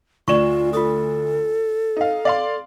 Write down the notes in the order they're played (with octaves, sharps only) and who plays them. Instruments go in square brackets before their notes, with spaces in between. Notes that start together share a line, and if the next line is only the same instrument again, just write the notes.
[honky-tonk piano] D2 E7 [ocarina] F4 [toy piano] D5 C#6
[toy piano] F4 D#6 [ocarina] A4
[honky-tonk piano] D#4 F5
D5 F5 C6